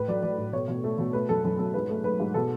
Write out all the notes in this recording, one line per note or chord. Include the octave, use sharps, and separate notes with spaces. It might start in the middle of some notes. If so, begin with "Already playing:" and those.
Already playing: A2 B4
F#3 D5
F#3 D5
A2
B2 C#5
B2
A3
B2
A3 B4
F#2 A4
F#2 A4
F#2 A4
G#2 B4
A3
A3 B4
G#2
B2 A4